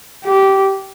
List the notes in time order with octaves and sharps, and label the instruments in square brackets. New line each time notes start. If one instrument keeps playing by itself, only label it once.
[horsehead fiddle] G4